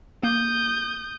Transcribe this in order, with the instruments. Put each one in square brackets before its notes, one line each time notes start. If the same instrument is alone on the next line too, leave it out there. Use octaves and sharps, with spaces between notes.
[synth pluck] A#3 [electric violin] D#6 G6